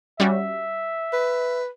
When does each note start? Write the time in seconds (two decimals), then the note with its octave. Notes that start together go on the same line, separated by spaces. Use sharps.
0.20 G3 C#4 F#4 E5
1.13 B4